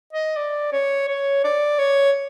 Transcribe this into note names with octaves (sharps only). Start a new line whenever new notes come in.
D#5
D5
C#5
C#5
D5
C#5